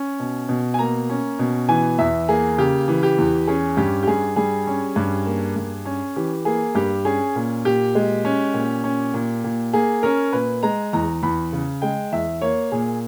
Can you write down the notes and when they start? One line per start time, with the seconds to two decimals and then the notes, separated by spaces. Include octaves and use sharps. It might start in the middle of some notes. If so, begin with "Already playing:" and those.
Already playing: C#4
0.20 B2
0.49 B2
0.74 G#5
0.79 A#3 A#5
1.10 C#4
1.39 B2
1.69 E3 G#5
1.98 E2 E5
2.29 A#3 G#4
2.58 C#3 G4
2.88 E3
3.03 G4
3.18 E2
3.47 C#4 G#4
3.77 G2 G4
4.03 G4
4.07 G2 G#4
4.36 G3 G#4
4.67 C#4
4.96 G2
5.26 A#3
5.56 G2
5.85 C#4
6.16 E3 G4
6.45 A#3 G#4
6.75 G2 G4
7.05 C#4 G#4
7.36 A#2
7.65 A#2 G4
7.95 G#3
8.25 C#4
8.54 A#2
8.84 C#4
9.14 A#2
9.44 A#2
9.73 A#3 G#4
10.03 C#4 A#4
10.33 A#2 B4
10.63 G#3 A#5
10.93 E2 A#5
11.23 E2 B5
11.52 C#3
11.82 G#3 G5
12.12 E2 E5
12.41 A#3 C#5
12.72 A#2 G#4